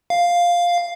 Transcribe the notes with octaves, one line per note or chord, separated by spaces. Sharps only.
F5